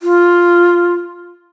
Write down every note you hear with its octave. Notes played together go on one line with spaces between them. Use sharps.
F4